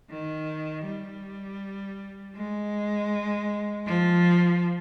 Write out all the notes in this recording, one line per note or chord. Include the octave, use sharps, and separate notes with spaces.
D#3
G3
G#3
F3